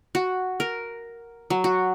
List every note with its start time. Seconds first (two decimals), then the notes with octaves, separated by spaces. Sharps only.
0.15 F#4
0.60 A#4
1.50 F#3
1.64 F#4